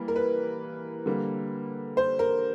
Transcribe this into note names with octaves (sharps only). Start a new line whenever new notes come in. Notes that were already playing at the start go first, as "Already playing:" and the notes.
Already playing: E3 G3 A#3
A#4
B4
D3 G3 A#3
C5
A#4